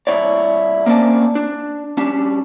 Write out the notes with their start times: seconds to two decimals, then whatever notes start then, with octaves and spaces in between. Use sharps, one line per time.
0.07 C2 F3 E4 C#5 D5
0.86 A#3 C4 C#4 D5 A5
1.35 D4
1.97 G3 C#4 D4